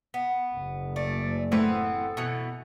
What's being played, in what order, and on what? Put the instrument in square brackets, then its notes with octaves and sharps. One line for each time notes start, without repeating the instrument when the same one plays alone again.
[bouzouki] B3
[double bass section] F#1
[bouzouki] A3 [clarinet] D5
[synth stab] A2 A3 [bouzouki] E3 B3 C4 [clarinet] A4
[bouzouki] B2 E3 [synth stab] C#7